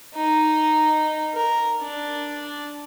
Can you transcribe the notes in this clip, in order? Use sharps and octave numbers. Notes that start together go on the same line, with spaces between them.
D#4
A#4
D4